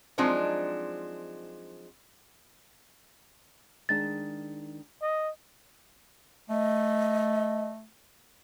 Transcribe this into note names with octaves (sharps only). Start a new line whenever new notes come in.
F3 F#3 G#3 C4 D4 D#4
D#3 G#3 D4 A6
D#5
A3 D#5